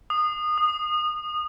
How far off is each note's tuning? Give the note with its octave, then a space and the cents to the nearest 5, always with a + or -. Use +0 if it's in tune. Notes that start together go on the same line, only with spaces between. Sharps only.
D#6 -25
D#6 -15